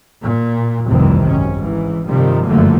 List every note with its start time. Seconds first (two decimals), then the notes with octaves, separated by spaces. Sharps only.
0.23 A#2
0.88 F1 C2 G2 C3 D#3 E3
1.26 G#1 F#2 C#4
1.57 G#2 E3
2.07 G2 C3 D#3 F3 G3
2.45 F#1 G2 D3 F3 A3 A#3